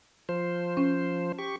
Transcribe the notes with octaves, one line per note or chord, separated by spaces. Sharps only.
F3 C5
C#4
G4 C#6